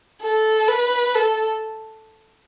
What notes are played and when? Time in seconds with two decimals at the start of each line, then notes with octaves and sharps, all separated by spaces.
0.22 A4
0.68 B4
1.15 A4